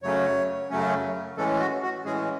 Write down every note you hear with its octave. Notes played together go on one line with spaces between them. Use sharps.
F#2 C#3 F#3 A3 C#4 C#5
F#2 C#3 F#3 A3 C#4
A2 E3 G#3 C#4 A4
F#4
F#4
A2 E3 G#3 C#4 G#4